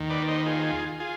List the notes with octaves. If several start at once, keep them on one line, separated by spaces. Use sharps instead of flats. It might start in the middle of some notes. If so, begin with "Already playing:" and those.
Already playing: D#2 D#3
B4 D5
C5 D#5
B4
F4 G#4
F4 G#4